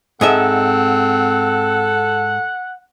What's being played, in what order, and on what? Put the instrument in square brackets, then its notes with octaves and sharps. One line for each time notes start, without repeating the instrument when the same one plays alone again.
[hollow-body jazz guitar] G#2 D#5 E5 [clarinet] C4 [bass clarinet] A4 [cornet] F#5